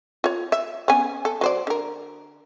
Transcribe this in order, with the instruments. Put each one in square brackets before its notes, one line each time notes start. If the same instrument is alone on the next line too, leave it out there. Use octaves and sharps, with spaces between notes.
[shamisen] F4 C#5
E5
B3 C#4 G#5
A4
F#3 C5 D5
D3 A#4